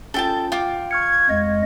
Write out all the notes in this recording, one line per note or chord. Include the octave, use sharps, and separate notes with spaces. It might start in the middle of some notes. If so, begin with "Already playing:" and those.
C#4 F4 A4 G5 A5
F4 G5 D6
C#6 F6 G#6 C#7
F2 G#3 D#5